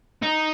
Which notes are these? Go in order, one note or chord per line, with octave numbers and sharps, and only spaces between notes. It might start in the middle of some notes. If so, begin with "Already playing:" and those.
D#4